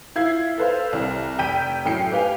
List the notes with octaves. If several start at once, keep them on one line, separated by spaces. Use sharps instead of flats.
E4 F4 G#6 C7
A4 B4 C5 F5
C2
F1 G5 G6 B6 D#7
F#2 A2 G5 C7 C#7
G4 B4 F5 G5 G#5